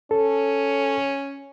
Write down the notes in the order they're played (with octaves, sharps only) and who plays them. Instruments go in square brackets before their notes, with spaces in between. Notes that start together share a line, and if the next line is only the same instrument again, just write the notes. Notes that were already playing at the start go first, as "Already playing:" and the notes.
[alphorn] C#4 [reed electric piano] A4